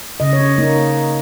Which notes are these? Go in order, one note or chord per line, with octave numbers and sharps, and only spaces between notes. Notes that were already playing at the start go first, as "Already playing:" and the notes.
C#3 D#5
C#5
C#4
A#3 D#4